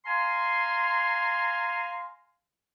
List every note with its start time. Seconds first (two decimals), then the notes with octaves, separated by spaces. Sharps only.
0.06 F5 G#5 A#5 C6